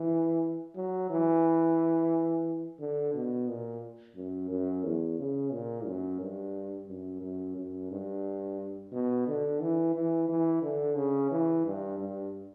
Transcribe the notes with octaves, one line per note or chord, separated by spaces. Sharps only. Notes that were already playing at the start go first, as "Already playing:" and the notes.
Already playing: E3
F#3
E3
D3
B2
A#2
F#2
F#2
E2
C#3
A#2
F#2
G2
F#2
F#2
F#2
G2
B2
D3
E3
E3
E3
D3
C#3
E3
G2
G2